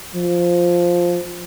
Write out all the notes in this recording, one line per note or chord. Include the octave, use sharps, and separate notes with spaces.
F3